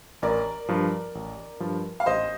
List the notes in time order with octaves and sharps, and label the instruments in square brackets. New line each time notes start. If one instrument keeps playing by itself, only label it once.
[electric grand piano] A1 [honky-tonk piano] A#4 D5
[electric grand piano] G2 F3
A1
G2 F3
[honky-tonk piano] F5
[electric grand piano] A1 [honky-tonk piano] C5 D#5